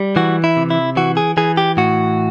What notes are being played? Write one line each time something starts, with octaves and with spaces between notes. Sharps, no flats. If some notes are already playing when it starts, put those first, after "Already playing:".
Already playing: G3
E3 F#4
E4
C3
E4
E3 F#4
G#4
E3 G#4
G4
A2 F#4